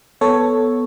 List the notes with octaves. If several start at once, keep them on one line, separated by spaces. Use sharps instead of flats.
B3 A4 C#5